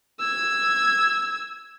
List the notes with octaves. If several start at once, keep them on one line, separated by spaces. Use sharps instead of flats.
E6 G#6